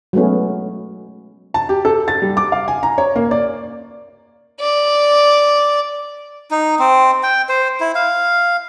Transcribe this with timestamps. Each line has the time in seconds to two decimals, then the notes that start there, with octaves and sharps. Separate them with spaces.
0.13 F#3 G#3 A3 B3 C#4
1.54 A5
1.69 G4
1.85 A4
2.08 A6
2.22 G3
2.37 D6
2.52 F5
2.68 G#5
2.83 A#5
2.98 C#5
3.16 A#3
3.31 D5
4.60 D5
6.51 D#4
6.79 C4
7.23 G5
7.49 C5
7.80 E4
7.95 F5